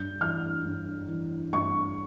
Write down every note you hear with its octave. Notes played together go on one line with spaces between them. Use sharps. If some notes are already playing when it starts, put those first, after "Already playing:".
Already playing: G2 G6
E3 F6
G2
E3
G2 C#6